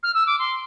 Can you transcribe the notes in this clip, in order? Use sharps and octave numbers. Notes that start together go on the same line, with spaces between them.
F6
E6
D6
C6